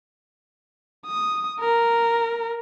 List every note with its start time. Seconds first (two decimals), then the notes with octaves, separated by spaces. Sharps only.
1.06 D#6
1.60 A#4